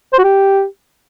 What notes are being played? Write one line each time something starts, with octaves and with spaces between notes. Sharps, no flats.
C5
F#4
G4